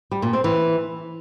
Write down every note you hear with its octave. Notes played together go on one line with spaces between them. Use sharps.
G3
A#2
C4
E3